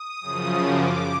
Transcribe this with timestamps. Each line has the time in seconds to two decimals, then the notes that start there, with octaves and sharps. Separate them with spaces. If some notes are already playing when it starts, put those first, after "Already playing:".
Already playing: D#6
0.21 F#2 C#3 F3
0.62 D6